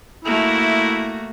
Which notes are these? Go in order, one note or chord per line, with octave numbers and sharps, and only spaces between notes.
A3 A#3 E4 F#4